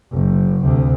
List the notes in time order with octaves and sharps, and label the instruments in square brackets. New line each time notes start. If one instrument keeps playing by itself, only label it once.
[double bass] F#1
D2 C3